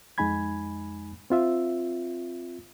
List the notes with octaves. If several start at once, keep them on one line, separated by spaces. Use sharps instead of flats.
F2 G#3 D#4 G#5 B5 G#6
C4 F4 E5